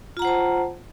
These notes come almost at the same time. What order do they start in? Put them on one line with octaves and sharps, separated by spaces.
F4 A#5 F#5 C5 A5